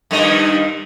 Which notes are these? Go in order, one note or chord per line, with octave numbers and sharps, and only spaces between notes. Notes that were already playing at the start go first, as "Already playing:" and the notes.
G2 D#3 D#5